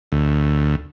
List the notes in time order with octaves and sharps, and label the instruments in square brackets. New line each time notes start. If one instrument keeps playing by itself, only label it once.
[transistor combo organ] D2